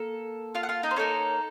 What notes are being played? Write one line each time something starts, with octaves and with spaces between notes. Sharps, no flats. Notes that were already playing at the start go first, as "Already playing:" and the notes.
Already playing: A#3 A4
F4 F5
F#5
F4 F5
D#4 D#5
C5
A#3 C#4 D#4 A4 C#5